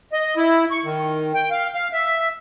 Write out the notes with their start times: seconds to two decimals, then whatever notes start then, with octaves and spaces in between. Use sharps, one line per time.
0.13 D#5
0.37 E4
0.71 C#6
0.84 D#3
1.34 G5
1.51 F5
1.75 F5
1.93 E5